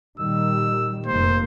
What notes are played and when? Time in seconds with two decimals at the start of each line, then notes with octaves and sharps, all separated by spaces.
0.20 A#2 D#3 G3 E6
1.06 F1 A#3 C5